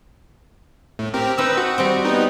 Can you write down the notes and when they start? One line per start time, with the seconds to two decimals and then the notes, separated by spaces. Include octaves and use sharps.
0.99 A2
1.14 C4 G4 A#4
1.38 C4 D#4 B4 E6
1.57 F#4
1.78 G3 C4
2.05 B3 D#4